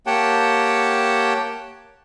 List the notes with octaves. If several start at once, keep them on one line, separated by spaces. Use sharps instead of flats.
A#3 G4 C#5 F#5 G5 A5